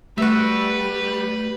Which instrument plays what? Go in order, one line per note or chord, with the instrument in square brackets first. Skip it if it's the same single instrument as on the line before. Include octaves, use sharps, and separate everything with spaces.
[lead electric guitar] G3 [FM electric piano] A3 [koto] F#4 E5 [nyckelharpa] B4